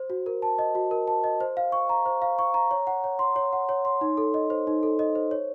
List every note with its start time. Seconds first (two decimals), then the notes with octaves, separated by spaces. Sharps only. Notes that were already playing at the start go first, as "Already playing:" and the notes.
Already playing: C5
0.10 F#4
0.26 A#4
0.42 A5
0.58 D#5
0.75 F#4
0.91 A#4
1.08 A5
1.24 D#5
1.40 C5
1.57 F5
1.72 C#6
1.89 A#5
2.06 C5
2.22 F5
2.39 C#6
2.54 A#5
2.71 C#5
2.87 F#5
3.04 C#5
3.19 C6
3.36 C#5
3.53 F#5
3.69 C#5
3.85 C6
4.01 D#4
4.17 A4
4.34 D#5
4.50 C5
4.67 D#4
4.83 A4
4.99 D#5
5.15 C5
5.31 C#5